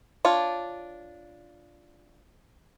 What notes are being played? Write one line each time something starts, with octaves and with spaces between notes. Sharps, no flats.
D4 F4 C#5